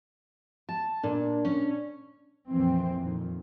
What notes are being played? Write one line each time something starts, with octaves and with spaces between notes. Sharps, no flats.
A5
A#2 D4
C#4
F2 A#2 E3 C4
F2 A#2 D#3